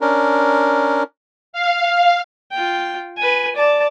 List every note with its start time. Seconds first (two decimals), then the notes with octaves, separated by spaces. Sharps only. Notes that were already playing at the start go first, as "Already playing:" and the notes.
0.01 C#4 D4 A#4
1.53 F5
2.52 F4 G5
3.18 B4 G#5
3.56 D5 A5